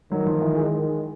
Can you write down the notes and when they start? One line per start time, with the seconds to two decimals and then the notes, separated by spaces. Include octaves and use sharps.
0.12 D#3 F#3
0.27 F3
0.42 E3
0.57 G#3